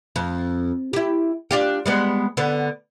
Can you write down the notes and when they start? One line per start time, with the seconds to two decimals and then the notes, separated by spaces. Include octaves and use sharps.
0.16 F2
0.93 E4 G4
1.51 D4 F4 G4
1.86 G3 G#3 B3
2.37 D3 B3